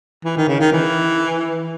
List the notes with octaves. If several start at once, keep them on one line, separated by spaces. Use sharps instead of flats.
E3
D#3
C#3
D#3
E3